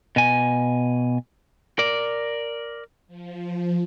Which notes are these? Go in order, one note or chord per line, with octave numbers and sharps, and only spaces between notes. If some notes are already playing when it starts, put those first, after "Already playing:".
B2 G#5
A#4 D5
F3